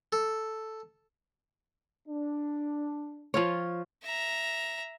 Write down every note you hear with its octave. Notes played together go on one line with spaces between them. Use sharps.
A4
D4
F3 F4 C#5
E5 A#5